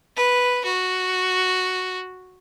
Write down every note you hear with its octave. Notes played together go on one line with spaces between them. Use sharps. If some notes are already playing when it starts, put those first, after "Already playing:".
B4
F#4